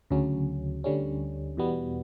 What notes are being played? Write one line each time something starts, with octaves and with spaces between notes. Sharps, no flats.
D2 C#3 F#3 C#4
D2 D3 G3 C#4
E2 B2 G3 B3